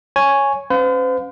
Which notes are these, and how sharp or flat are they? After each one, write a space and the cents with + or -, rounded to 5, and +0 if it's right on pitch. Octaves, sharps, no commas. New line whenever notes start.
C#5 +0 G#5 +0
C#4 -20 C5 -45 F5 +35